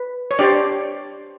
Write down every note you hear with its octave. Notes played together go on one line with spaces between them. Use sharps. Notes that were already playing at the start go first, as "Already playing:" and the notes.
Already playing: B4
C#5
D4 G4 C5 D5